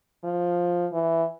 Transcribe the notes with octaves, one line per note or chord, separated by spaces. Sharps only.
F3
E3